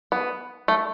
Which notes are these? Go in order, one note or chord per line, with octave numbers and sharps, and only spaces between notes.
B3
A3